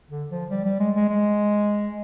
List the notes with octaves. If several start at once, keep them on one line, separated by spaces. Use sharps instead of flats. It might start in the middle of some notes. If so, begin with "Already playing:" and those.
D3
F3
G3
G3
G#3
G#3
G#3